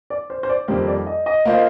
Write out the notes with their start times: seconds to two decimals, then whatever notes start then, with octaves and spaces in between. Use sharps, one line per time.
0.10 D5
0.30 C5
0.43 C5
0.49 D5
0.68 F2 D#3 G3 A#3 C5
0.87 D5
1.07 D#5
1.26 D#5
1.45 A#3 F4 C5 D#5 F5